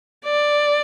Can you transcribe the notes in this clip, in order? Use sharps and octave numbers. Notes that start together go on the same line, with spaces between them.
D5